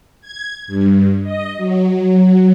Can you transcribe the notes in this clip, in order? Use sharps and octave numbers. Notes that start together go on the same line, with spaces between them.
G#6
G2
D#5
F#3